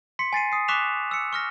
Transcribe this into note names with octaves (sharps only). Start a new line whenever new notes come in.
C6 B6 C#7
G#5 A6 C7 D#7
D#6 C7
C#6 D6 F#6 B6 E7 F7
E6 C#7
C#6 F6 A#6